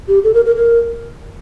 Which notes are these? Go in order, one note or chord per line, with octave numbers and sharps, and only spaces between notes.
G4
A4
A#4
A#4
A#4